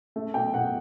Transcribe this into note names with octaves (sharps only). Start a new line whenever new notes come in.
A3
B2 G5
B2 F#5